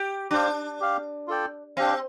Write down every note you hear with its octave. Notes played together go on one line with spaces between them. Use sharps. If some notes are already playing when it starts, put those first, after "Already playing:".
Already playing: G4
D4 G4 C5 F5
G4 F5
F4 A4 D5 G5
C4 D4 G4 F5